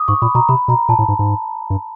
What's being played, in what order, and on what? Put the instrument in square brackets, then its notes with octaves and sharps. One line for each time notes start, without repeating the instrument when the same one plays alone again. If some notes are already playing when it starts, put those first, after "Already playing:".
Already playing: [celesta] D6 D#6
[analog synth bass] G#2 [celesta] C#6
[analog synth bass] A#2 [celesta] B5
[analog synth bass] B2 [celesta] A#5
[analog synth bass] C3 [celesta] B5
[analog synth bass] B2 [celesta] A#5
[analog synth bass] A#2 [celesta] A5
[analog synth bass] A2
G#2
G#2
G2